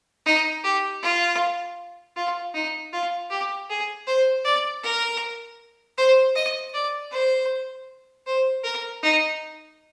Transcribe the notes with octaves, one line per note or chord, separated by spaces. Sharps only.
D#4
G4
F4
F4
D#4
F4
G4
G#4
C5
D5
A#4
C5
D#5
D5
C5
C5
A#4
D#4